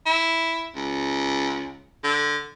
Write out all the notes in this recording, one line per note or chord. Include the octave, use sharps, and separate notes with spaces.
E4
C#2
D3